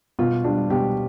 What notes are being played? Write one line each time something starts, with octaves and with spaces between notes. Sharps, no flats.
B2 F4
G3 D4
B2 G4